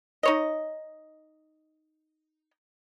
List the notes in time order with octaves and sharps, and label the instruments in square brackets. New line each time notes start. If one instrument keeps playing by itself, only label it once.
[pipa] D#4 C#5 D#5